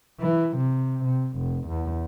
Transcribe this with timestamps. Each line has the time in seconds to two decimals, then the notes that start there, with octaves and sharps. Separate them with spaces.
0.21 E3
0.57 C3
1.04 C3
1.38 F1
1.68 E2